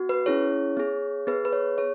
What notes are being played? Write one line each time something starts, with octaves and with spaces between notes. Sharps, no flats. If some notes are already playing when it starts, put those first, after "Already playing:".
Already playing: B3 F#4
B4
C#4 E4 G#4 C#5
B3 G#4
B3 G#4 B4
B4
C#5
G#4 C#5